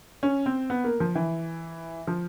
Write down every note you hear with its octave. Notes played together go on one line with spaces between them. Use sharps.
C#4
C4
B3
A#3
F3
E3
F3